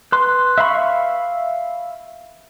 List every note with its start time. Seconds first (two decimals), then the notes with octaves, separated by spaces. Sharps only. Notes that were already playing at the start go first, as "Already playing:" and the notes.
0.12 B4 C6
0.58 E5 F5 B5 C#6